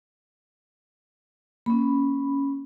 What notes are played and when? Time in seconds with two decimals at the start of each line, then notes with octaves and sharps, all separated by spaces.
1.66 A#3 C#4 B5